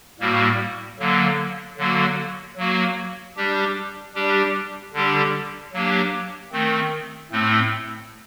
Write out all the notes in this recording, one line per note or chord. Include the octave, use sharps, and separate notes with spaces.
A2 G3 A#3 F#4
D3 F#3 A#3
D3 F#3 A#3 F#4
F#3 A#3 F#4
G3 D4 G4
G3 D4 G4
D3 G3 D4 G4
F#3 A#3 D4 G4
D#3 A3 C4
A2 A3 C4